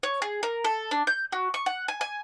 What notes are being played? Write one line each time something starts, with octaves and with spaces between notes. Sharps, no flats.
C#5
G#4
A#4
A4
D4
G6
F#4
C#6
F#5
G#5
G#5